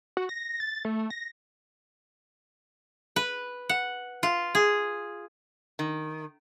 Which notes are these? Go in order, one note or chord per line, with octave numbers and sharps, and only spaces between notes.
F#4
A#6
A6
A3
A#6
B4
F#5
F4
G#4
D#3